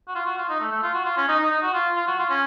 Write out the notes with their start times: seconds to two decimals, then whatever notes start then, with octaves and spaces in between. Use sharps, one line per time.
0.08 F#4
0.15 F4
0.26 F#4
0.38 F4
0.49 D#4
0.60 A3
0.72 A3
0.82 F4
0.94 F#4
1.05 F4
1.17 C#4
1.28 D#4
1.39 D#4
1.51 D#4
1.62 F#4
1.74 F4
1.96 F4
2.08 F#4
2.19 F4
2.30 C#4